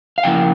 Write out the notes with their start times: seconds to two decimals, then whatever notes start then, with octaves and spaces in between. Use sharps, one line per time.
0.18 F5
0.23 C#3 F3 A#3 E4 G5